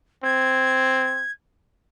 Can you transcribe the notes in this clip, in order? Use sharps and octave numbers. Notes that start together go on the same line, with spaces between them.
C4 G#6